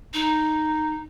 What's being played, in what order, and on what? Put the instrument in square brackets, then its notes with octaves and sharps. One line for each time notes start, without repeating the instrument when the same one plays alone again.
[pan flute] D#4